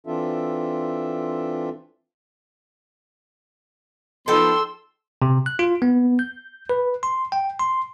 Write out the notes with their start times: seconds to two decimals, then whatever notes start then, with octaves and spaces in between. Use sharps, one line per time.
0.06 E3 C4 D4 F4 A4 E5
4.28 F3 B3 D#4 A4 G5 C6 E6
5.22 C3
5.46 F#6
5.59 F4
5.82 B3
6.19 G6
6.70 B4
7.03 C6
7.32 G5
7.59 C6